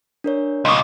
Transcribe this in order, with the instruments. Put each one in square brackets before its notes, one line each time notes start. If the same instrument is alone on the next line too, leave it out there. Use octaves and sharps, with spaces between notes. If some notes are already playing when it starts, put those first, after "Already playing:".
[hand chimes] D4 A#4 C#5
[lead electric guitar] C#2 B2 [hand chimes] D#5 C#6 D6